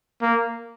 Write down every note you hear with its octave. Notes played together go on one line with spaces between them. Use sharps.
A#3